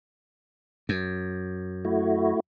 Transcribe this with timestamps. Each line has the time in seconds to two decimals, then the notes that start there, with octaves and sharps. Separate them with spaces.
0.89 F#2
1.85 A3 E4 F#4